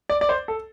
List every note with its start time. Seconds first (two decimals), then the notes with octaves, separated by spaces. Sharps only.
0.09 D5
0.21 D5
0.29 C5
0.48 A4